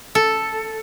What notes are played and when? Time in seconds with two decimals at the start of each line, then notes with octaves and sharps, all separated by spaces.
0.15 A4